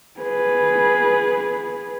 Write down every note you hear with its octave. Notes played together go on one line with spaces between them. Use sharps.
G#4 B4